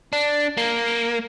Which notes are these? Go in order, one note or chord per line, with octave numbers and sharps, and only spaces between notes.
D4
A#3